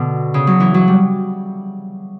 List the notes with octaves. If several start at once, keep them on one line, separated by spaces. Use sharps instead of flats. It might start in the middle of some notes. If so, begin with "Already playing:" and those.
Already playing: B2 D3
C#3
F#3
E3
F#3
G3